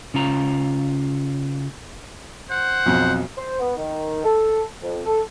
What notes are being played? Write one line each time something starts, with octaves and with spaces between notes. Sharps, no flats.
C#3 C#4 F4 A#5
C5 F#5
B1 F2
C5
B3
D#3
A4
F2
A4